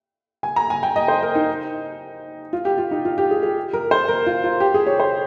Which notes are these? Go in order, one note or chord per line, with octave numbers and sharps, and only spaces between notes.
G#5
A#5
G#5
G5
D#5
C5
A#4
D#4
F4
G4
F4
D#4
F4
G4
G#4
G#4
A#4
C5
A#4
F4
F4
G4
G#4
C#5
C5